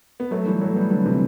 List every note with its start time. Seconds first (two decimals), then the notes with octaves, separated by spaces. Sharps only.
0.20 B3
0.31 F#3 A3
0.46 E3 G3
0.61 F#3 A3
0.76 G3 B3
0.91 D3 F#3
1.06 C3 E3